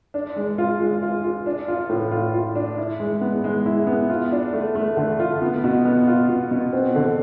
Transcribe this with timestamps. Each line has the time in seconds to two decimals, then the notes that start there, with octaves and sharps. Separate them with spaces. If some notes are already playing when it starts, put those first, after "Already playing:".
0.14 D4
0.36 G#3
0.58 F4
0.80 G#3
1.03 F4
1.24 F4
1.46 D4
1.68 F4
1.89 A2
2.12 F4
2.34 F4
2.55 D4
2.78 E4
3.00 G#3
3.21 B3
3.44 G#3
3.66 E4
3.87 B3
4.10 F4
4.32 D4
4.53 A3
4.75 A3
4.97 D3
5.20 F4
5.42 B3
5.64 B2
5.85 B3
6.07 F4
6.29 B2
6.51 B2
6.73 C4
6.95 D3